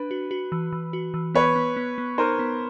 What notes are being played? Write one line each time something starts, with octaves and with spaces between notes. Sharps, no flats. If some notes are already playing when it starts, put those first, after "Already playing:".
Already playing: D4 B4
F#4
F#4
E3
E3
F#4
E3
B3 B4 C#5
B3
B3
B3
D#4 A#4 C5
B3